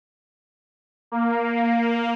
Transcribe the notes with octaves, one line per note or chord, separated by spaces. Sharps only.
A#3